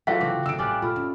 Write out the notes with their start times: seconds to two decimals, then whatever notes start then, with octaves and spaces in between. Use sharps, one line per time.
0.07 E3 F#3 A3 F4 F5 F#5 B6
0.21 C#3 E3 C4 F#4 D6
0.46 D3 E6 D7
0.59 A1 G3 F4 D5 G#5 D6 F#6
0.82 A#2 A3 F4 B5 F6
0.96 C#4